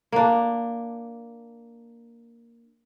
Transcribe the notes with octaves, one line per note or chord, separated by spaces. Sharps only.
A#3 D4